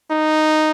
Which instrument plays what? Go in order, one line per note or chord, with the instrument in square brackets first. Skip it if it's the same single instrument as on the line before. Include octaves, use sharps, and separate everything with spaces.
[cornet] D#4